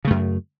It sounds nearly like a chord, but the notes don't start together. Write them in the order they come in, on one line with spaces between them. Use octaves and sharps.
C#3 A3 F#2